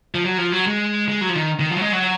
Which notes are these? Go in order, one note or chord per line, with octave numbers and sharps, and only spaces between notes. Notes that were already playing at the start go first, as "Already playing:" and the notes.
F3
F#3
F3
F#3
G#3
G#3
F#3
F3
D#3
D#3
F3
F#3
G#3
F#3